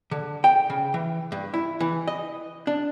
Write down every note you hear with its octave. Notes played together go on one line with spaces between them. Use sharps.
D3
G5
C#3
E3
G2
E4
E3
D#5
D4